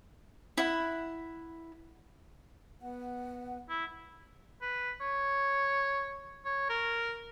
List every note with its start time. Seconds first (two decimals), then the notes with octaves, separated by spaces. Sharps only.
0.57 E4 F#5
2.82 B3 F#5
3.70 E4
4.62 B4
5.01 C#5
6.45 C#5
6.70 A#4